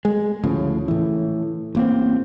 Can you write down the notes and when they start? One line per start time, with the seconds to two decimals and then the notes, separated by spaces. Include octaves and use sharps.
0.05 G#3
0.43 D2 A2 C#3 F3
0.88 A2 E3
1.75 A1 A#3 C4